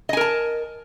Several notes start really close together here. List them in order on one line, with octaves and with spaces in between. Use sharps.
D#5 G#5 A#4 A5